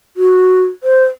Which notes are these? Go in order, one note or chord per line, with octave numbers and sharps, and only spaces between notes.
F#4
C5